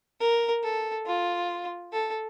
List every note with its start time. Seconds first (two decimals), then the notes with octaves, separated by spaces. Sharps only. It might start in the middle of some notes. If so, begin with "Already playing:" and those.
0.20 A#4
0.63 A4
1.06 F4
1.93 A4